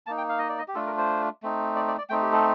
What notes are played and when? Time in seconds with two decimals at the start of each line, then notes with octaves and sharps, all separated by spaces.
0.06 A#3 D#4 A5
0.18 G5
0.29 F5
0.39 D#5
0.49 D5
0.58 D#5
0.68 G4
0.75 A3 D4 F4 A4
0.87 A#4
0.98 C5
1.42 A3 C4 D#4
1.76 D5
1.88 D5
1.98 D5
2.09 A3 C4 D#4 G5
2.22 G4
2.32 A4